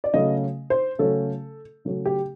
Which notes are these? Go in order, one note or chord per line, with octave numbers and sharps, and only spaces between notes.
D5
C#3 F#3 A3 C#4 D#5
C5
C#3 F#3 A3 C#4 A4
C#3 F#3 A3 C#4
G4